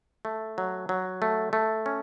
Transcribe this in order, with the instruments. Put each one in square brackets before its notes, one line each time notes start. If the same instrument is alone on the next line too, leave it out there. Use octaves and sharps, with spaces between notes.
[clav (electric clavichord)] A3
F#3
F#3
A3
A3
C#4